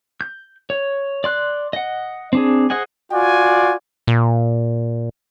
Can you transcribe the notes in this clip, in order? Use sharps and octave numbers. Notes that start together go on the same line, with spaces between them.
G6
C#5
D5 C6 F#6
D#5 F#5
C4 D4 G#4
G#4 C5 D#5 F#5 G#5
F4 F#4 D5 G#5
A#2